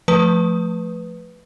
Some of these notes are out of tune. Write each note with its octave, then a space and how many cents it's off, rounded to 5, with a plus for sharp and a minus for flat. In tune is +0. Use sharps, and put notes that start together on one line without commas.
F3 +0 A3 +0 B4 +0